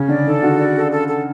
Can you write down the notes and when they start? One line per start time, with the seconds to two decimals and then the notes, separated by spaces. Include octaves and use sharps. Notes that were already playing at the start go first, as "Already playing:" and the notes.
Already playing: C#3 C#4
0.08 D3 D5
0.25 D#3 A4
0.42 D3 F#4
0.59 D5
0.75 A4
0.92 A4
1.09 A4